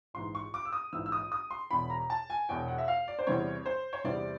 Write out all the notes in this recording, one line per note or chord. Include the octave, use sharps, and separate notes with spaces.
A#1 G#2 E3 C6
C#6
D6
E6
D#6
A#1 G#2 E3 E6
E6
D#6
D#6
C6
E1 E2 B2 B5
A#5
A5
G#5
E1 E2 B2 G5
F#5
E5
F5
D5
C5
E2 C3 E3 G3 C4 C#5
C5
C#5
E2 C3 E3 G3 C4 D5